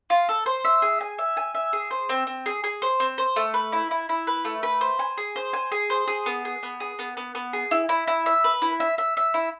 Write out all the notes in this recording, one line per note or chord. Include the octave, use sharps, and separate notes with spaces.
F4
A4
C5
E5
G#4
G#5
E5
G#5
E5
G#4
C5
C4
C4
G#4
G#4
C5
C4
C5
A3
B4
E4
E4
E4
B4
A3
B4
C5
G#5
G#4
C5
G#5
G#4
C5
G#4
B3
G#4
B3
G#4
B3
B3
B3
G#4
E4
E4
E4
E5
B4
E4
E5
E5
E5
E4